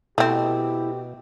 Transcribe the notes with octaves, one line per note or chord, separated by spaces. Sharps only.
B2 A3 C4 E4 G4